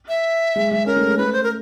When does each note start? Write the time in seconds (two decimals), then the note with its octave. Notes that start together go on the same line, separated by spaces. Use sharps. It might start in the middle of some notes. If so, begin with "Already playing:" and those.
0.08 E5
0.56 G#3
0.71 G#3
0.86 C#4 A#4
0.97 A3
1.07 G#3
1.17 A3 B4
1.33 C5
1.43 A#4